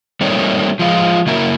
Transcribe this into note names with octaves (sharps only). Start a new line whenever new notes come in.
G3 A3 A#3 C4 D#4 C#5
F3 G#3 F4
C#3 F#3 A#3 E4 A#4 A#5